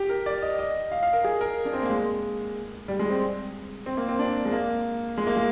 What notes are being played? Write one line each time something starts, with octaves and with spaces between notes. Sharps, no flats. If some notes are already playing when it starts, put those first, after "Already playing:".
Already playing: G4
A#4
D5
D#5
D#5
F5
F5
A#4
G#4
A#4
D4
C4
A#3
G#3
G3
G#3
C4
C4
A#3
C4
D4
G#3
A#3
G#3
A#3
G#3